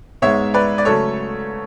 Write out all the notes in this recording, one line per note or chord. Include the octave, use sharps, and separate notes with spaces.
G#2 G#3 B3 C#5 E5
B4 D5
D5
C#3 F#3 A3 A4 C#5